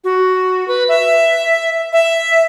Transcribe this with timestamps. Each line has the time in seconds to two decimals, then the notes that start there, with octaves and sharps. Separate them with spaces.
0.04 F#4
0.68 B4
0.89 E5
1.93 E5